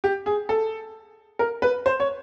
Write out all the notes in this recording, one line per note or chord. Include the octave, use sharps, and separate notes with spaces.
G4
G#4
A4
A#4
B4
C5
C#5